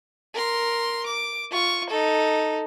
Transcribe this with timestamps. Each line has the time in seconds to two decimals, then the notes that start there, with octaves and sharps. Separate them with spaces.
0.34 A#4 C6
1.06 D6
1.51 F4 C#6
1.90 D#4 A4